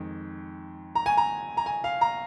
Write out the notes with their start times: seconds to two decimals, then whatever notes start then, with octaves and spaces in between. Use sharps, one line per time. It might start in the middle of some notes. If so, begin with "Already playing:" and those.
Already playing: F2 D#3 G#3
0.95 A#5
1.06 G#5
1.17 A#5
1.57 A#5
1.66 G#5
1.84 F5
2.01 A#5